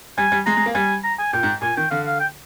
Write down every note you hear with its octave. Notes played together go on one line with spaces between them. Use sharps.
G3 G#5
G3
G#3 A#5
G#3
A#3
G3 G#5
A#5
G#5
A#2 G5
G#2
A#2 G#5
D#3 G5
D3 F5
F5
G5